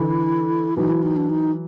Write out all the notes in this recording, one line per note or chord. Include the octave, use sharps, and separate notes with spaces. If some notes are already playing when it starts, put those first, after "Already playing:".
Already playing: D3 E3 E4
E3 F#3 D#4
E4
D#4
D4
D#4